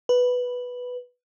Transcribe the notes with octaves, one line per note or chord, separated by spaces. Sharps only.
B4